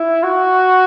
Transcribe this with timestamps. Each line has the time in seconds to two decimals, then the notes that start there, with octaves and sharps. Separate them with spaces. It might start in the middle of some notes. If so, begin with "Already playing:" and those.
Already playing: E4
0.23 F#4